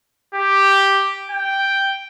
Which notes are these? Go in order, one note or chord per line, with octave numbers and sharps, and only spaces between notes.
G4
G5